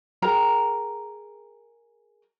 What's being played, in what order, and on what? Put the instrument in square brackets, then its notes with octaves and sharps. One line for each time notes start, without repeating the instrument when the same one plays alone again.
[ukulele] G#4 A#4 G5 A#5